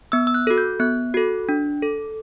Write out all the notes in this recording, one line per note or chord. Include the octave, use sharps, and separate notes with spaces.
B3 E6
E6
F#6
F#4 A4
G6
B3 F#6
F#4 A4
D4
A4